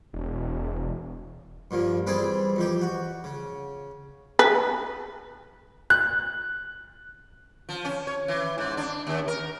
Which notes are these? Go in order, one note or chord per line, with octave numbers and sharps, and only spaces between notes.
E1
G2 A#2 F3
E3 G3 C4 G#4 D5
F2 E3 G4
F#4
C#3
B4
F#6
F3
C#4
C#5
E3
G#2
D4
D#2
A#4